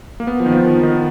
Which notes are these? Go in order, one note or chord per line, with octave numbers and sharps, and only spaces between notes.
A#3
B3
F3
D#3
F3
D#3
D#3